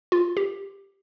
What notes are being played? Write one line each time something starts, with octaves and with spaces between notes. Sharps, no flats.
F4
G4